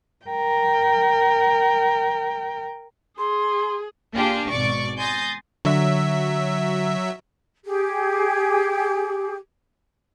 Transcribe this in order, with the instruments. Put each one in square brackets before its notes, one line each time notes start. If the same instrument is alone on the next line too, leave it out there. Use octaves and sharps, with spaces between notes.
[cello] A#4 G5
[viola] G#4 [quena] C6
[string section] A#3 D4 F4 G4 G#4
G#1 B2 D5 C#6 D6
G#5 C6 D#6 G6 A6 A#6
[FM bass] D3 [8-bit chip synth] F#3 E5
[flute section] G4 G#4